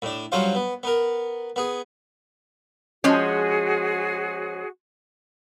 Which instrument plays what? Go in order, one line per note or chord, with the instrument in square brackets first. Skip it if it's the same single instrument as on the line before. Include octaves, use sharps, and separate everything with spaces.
[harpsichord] A2 D4
G2 F#3 C#4 F4 C5 F5
B3
B3 A#4
B3 G#4
[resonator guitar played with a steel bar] F3 G#3 C#4 [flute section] F#4 G#4